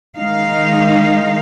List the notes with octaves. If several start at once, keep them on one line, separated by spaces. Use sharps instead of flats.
D#3 G#3 D#4 F5